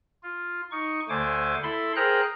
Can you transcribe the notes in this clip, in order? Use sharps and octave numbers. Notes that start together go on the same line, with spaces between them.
F4
D#4 C#6
D2 D3 A3 C5 G#5 D6
E4 A4 B5 C6
G#4 A#4 C5 G5 A#5 F#6